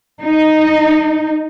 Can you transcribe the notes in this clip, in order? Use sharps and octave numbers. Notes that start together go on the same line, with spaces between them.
D#4